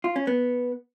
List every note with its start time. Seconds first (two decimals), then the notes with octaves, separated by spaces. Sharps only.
0.04 F4
0.16 C#4
0.27 B3